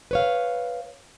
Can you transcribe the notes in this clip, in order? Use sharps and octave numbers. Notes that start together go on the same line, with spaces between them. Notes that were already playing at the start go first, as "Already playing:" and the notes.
B4 C#5 F5